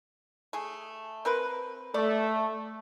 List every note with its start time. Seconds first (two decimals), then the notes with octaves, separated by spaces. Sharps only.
0.53 A3 G#4
1.25 C4 A#4 B4
1.94 A3 D5